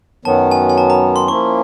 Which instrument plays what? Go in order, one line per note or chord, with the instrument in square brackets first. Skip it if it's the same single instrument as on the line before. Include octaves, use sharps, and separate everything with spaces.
[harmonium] F#2 D#3 F#3 B3 [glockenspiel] A5
[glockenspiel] G#5
G#5
A5
A#5
C6
[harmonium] F3 A#3 C#4 E4 [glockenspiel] C#6